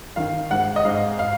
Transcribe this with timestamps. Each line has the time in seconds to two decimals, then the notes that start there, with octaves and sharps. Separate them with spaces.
0.16 D#3 F5
0.51 G#2 F#5
0.76 D#5
0.85 G#2 F5
1.19 F5